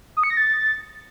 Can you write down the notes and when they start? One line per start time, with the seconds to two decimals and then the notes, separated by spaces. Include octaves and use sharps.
0.17 D#6
0.23 C#7
0.30 A#6
0.37 A6